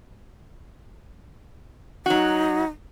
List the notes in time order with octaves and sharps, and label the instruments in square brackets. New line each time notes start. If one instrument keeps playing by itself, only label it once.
[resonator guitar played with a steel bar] F#3 F#4 [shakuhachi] D#4